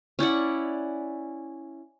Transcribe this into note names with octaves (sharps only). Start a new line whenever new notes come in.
C#4 E4 D5 F#5